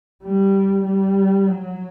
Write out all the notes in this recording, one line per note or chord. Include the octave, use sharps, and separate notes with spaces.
G3
G3
F#3